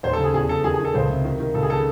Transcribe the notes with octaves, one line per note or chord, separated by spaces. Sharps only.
D#2 C5
A4
C#3
G#4
E2 G#4
C#3 A4
D#3 G#4
G#4
D#3
A4
C#2 C5
C3
D#3
D#3
C#2 A4
G#4
C#3 A4